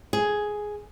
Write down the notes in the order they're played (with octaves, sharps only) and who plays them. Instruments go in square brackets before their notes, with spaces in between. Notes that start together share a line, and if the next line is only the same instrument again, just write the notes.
[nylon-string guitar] G#4